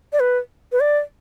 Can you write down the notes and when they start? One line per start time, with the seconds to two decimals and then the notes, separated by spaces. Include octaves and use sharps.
0.13 D5
0.20 B4
0.72 B4
0.80 D5